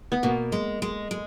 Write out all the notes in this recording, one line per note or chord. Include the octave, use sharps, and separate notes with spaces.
B3
B2 A#3
G#3
G#3
G#3